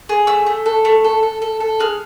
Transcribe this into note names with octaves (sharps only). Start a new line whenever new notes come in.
G#4
A3 E6
A3
A4
A3
A4
A4
A4
A4
G#4 F6